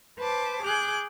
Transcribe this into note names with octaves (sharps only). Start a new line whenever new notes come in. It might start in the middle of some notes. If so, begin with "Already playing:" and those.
B4 C5 A5 D6
G#4 D6 F#6 G6